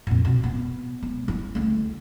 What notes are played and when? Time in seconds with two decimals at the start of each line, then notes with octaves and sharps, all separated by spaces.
0.07 F2 A#2
0.25 B2 E3
0.44 B3
1.03 G#3
1.28 G3 E4
1.55 D2 A3